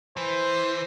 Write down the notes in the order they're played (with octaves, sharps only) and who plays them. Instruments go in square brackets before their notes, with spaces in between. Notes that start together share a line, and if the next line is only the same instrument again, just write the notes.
[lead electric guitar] E3 [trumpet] C5